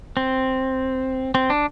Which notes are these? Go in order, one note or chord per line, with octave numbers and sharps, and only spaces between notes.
C4
C4
D4